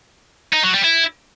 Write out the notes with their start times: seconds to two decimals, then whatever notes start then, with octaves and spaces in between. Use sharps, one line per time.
0.53 D#4
0.63 F#3
0.74 G3
0.84 E4